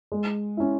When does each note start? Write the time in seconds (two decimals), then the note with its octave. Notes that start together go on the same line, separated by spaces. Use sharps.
0.12 G#3
0.57 C#4 E4